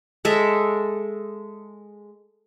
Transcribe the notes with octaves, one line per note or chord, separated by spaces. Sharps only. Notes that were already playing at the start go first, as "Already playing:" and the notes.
G#3 A4 E5